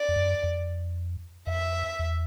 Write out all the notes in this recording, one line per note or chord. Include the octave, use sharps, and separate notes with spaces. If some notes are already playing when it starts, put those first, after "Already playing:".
Already playing: D5
F2
F#2
F2
F2 E5
E2